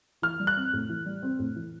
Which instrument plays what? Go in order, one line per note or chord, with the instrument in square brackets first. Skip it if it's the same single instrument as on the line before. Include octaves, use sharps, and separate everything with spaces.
[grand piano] E3 [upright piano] F6
[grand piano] G3
[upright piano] F#6
[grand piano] C4
A2
E3
G3
C4
A2
E3